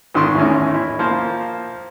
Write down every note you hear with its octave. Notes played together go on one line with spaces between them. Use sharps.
G#1 D#3 C6 C#6
E2 A2 D#3 C#4
E4
F3 A#3 C5